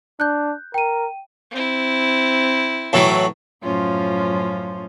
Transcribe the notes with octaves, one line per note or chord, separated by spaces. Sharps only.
D4 F#6 G6
A#4 G5 D#7
C4 E4
A2 E3 F#3
F#2 A2 F3 C#4 F4